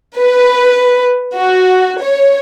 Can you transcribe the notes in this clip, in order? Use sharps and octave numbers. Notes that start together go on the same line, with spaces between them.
B4
F#4
C#5